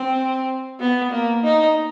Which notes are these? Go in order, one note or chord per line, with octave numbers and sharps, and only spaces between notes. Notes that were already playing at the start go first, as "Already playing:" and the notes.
Already playing: C4
B3
A#3
D#4